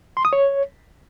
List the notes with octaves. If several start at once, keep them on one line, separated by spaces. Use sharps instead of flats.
C6
D#6
C#5